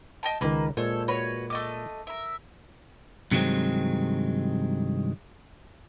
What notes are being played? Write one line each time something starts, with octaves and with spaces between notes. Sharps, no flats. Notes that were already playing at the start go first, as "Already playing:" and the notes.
D#5 G5 A5
C#2 D#3 A#3 B4
A#2 G#3 A4 C5 C#5
F#4 B4 C#5
A3 D#5 D6
A#4 E5
G2 C3 D#3 F#3 G#3 C4